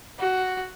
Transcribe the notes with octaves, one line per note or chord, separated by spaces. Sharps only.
F#4